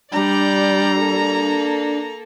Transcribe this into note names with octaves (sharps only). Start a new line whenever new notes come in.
G3 D4 D5 A#5 G6
A#3 A4